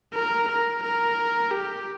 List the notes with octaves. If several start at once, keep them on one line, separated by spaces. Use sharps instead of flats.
A#4
A#4
A#4
G4